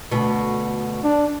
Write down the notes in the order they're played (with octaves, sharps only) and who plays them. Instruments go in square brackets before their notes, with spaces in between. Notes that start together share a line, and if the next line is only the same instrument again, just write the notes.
[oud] D2 B2
[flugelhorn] D4